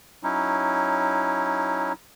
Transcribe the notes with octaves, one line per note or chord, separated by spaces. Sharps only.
F#3 C#4 D#4 E4